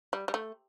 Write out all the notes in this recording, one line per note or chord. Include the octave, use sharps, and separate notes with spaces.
G3
G3
A3